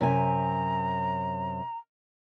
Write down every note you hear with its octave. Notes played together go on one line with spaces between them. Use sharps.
F#2 C3 G#5 A#5